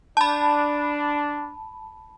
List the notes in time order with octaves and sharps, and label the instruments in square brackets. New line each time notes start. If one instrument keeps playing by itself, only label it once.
[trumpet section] D4 [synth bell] A5 B5